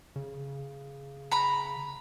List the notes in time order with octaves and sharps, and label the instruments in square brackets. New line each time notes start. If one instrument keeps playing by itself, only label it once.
[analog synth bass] C#3
[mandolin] A#5 B5